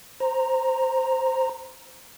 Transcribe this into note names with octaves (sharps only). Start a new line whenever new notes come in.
C5 A#5